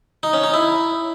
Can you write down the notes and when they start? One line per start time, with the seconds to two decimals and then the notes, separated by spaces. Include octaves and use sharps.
0.23 D#4
0.33 C#4
0.44 D#4
0.54 E4